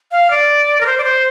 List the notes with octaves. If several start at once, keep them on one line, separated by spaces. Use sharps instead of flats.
F5
D5
A#4
C5
D5
C5